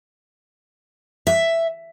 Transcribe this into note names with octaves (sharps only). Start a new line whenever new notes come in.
E5